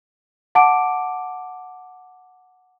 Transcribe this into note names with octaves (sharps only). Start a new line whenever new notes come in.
F#5 A5 D6 D7